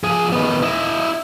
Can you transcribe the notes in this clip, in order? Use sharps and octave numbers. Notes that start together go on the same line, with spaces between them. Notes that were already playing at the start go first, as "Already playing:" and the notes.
F3 G#4
D#3 B3
E4 D#5